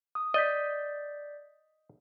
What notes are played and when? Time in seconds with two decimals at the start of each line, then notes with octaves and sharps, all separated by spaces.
0.15 D#6
0.34 D5 D#5 G6 B6